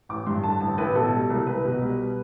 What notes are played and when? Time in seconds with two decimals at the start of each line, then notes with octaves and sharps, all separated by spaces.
0.09 A1 D6
0.26 G2 C6
0.43 D3 A5
0.61 A1 A5
0.78 A1 B4
0.95 B2 A4
1.13 G3
1.30 C2
1.47 C2 B4
1.65 B2
1.82 G3